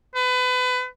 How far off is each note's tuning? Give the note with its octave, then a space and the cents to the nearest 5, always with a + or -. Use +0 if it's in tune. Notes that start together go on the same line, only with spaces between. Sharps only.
B4 +30